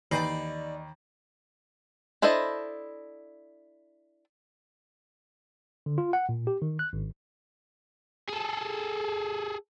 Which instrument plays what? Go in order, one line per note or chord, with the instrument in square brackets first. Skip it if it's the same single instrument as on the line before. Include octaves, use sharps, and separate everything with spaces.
[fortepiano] D#2 [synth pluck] E3 G6 C7 [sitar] D#4 D5 D#5 [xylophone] B5
[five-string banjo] D4 E4 A4 C5 D#5
[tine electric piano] D3
F4
F#5
A#2
G4
D#3
F#6
G#1
[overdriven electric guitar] G#4 A4